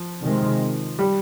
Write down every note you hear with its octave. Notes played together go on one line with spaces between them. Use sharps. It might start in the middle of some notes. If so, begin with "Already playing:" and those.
Already playing: F3
C3 D#3 G#3 C4
G3